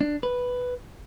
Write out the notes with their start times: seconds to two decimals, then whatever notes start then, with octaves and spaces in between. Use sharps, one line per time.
0.01 D4
0.23 B4